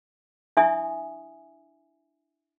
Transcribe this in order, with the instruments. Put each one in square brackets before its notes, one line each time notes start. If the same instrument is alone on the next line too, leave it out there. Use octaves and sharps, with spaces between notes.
[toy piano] D4 E4 E5 G#5 C#6 D#6